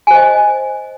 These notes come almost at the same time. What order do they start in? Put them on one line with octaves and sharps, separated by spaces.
G#5 C5 D#5